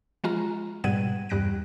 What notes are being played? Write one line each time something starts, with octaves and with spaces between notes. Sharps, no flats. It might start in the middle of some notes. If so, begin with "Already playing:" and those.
F3 G#3 F4 A#5
G#2 B2 G3 F#5 G#6 D#7
E2 G2 G3 F#6 A#6 D7